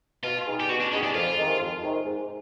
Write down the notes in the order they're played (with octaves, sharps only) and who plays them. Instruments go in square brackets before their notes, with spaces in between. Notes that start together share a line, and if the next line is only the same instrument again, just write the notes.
[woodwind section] B2 [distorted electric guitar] F4
[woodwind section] G3 B3 D#4 G#4
[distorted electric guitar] G4
[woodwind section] B2 [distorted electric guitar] F#4
[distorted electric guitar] D4
[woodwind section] G3 B3 D#4 G#4 [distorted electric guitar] C#4
[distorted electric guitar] D4
[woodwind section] F2 [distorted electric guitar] F4
[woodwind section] C3 D#3 G#3
F2
C3 D#3 G#3
G#2